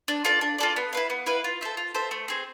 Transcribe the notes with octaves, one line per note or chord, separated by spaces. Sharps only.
D4
F4 A4 D5
D4
F4 A4 D5
B3
E4 B4 F5
B3
E4 B4 F5
F4
A4 C5 E5
F4
A4 C5 E5
A3
C4 G#4 C5